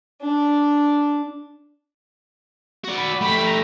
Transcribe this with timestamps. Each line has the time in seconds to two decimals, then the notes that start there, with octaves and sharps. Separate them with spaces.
0.22 D4
2.84 F#4 D5
2.96 B5
3.21 A3 G4 B5
3.45 A#5